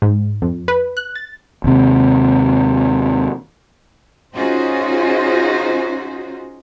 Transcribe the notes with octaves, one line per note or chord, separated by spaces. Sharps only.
G#2
F2
B4
F#6
A6
D#2 C3
C#4 D#4 F4 F#4 G#4 C5